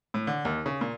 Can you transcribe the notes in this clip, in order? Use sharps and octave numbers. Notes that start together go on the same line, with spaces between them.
A2
D3
D#2
C#3
A#2